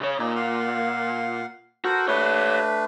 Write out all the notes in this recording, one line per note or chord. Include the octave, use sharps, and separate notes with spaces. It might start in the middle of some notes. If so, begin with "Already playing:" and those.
C#3 C#5
A#2 D#4
F5 F#5
F#4 A4 A#4 C5
A3 D4 G4 B4 C#5